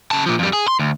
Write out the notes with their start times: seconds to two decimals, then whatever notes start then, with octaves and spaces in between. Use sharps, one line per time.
0.11 C#3 A5
0.26 A#2 F3
0.39 F2 G3
0.53 G#4
0.68 C6
0.79 D2